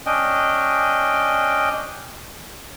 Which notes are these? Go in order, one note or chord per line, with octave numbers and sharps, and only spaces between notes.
C#4 D4 D#5 G5